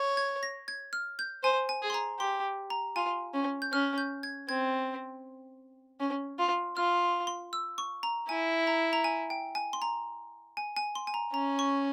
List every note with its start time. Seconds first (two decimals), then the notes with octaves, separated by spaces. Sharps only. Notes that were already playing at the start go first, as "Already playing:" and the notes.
Already playing: C#5
0.17 G#6
0.43 A#6
0.68 G#6
0.93 F6
1.19 G6
1.44 C5 G#5
1.69 G#5
1.82 G#4
1.90 C6
1.94 A#5
2.19 G4 C6
2.70 A#5
2.96 F4 G#5
3.34 C#4
3.62 G6
3.73 C#4 F6
3.98 G6
4.23 G#6
4.49 C4 G#6
6.00 C#4
6.39 F4
6.77 F4 F6
7.27 C6
7.53 E6
7.78 C#6
8.03 A#5
8.29 E4 G#5
8.67 A#5
8.93 A#5
9.04 G#5
9.30 G5
9.55 G#5
9.73 C6
9.82 A#5
10.57 G#5
10.76 G#5
10.95 C6
11.07 G#5
11.14 A#5
11.33 C#4 A#5
11.59 C#6